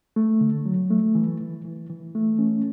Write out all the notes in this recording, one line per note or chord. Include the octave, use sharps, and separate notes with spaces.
A3
D3
F#3
A3
E3
E3
E3
E3
A3
C#4